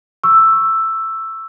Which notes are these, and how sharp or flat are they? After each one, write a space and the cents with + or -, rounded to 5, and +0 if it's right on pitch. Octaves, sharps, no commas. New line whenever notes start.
C#6 +0 E6 +5